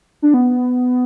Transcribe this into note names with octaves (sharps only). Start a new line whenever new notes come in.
D4
B3